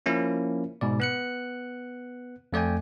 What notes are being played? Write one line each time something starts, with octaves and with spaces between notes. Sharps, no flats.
F3 A#3 C#4 E4
G#2 B2 D5
B3 F#6 C#7
F2 A3 D5 G5 G#5